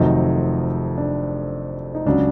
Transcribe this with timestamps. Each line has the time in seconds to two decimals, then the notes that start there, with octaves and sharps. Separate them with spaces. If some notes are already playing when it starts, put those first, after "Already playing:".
Already playing: F1 F2 C3 D#3 F#3 D#4
0.98 D4
1.95 D#4
2.06 C#2 C#3 F#3 D4